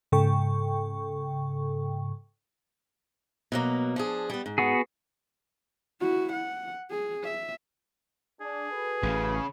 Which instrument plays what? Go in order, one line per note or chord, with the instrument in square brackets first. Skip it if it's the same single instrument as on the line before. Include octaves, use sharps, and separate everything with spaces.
[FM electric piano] G#2 C#3 A4 G5 C#6
[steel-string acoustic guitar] B2 F#3 A#3
F3 D4 G#4
G3 B3
G#2
[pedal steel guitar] B3 F#4 G#4
[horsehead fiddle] E4 F#4
F#5
G#4
E5
[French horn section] D4 [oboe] G#4
[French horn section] F#4 A4 B4
[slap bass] A1 [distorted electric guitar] C#3